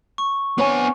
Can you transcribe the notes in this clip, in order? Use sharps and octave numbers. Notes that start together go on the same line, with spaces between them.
C#6
B3 C4 D4 C#5 G#5